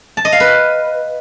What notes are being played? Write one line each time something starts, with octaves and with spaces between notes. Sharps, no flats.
A5
D#5
F5
B4